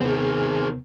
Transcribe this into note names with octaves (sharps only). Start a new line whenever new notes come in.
D#2 C3 D#3 B3 C4 G#4